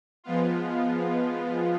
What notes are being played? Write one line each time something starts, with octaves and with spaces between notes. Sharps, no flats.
F3 G#3 B3 F4